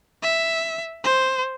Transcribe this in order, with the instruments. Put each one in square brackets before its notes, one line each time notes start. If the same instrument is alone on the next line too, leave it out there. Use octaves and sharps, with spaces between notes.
[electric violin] E5
C5